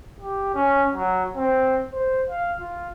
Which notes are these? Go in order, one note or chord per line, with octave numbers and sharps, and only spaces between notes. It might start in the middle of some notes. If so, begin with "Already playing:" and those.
G4
C#4
F#3
C4
C5
F5
F4